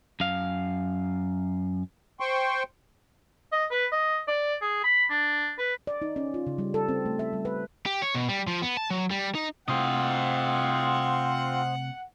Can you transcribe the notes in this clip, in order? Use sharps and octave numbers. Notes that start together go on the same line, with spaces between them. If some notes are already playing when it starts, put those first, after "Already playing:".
F#2 F5
C5 G5 C6 C#6
D#5
B4
D#5
D5
G#4
B5
D4
B4
D5
D#4
C#4
F4
C#3
G3
A4
C4
A3
E5
G3
B4
G4
C#5
B2
G3
F3
B3
A5
F#3
G3
D#4
C3 A3 C4 F4 C5 D#5 F#5